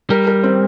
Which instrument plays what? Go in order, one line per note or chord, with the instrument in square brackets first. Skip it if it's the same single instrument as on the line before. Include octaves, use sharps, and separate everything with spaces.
[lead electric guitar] G3 [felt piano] A#4
[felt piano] A#4
C4